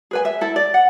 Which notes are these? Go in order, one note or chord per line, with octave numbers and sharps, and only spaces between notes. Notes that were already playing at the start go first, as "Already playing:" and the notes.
G#4 B4 G#5
E5
E4 A4
D5
F#5